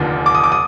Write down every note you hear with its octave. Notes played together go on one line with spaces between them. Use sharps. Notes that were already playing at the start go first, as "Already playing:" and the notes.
Already playing: F1 D#2 D3 F3
D6
D#6
D6
D#6